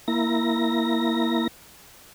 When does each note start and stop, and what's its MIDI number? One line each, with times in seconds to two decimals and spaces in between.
0.08 1.48 58
0.08 1.48 64
0.08 1.48 94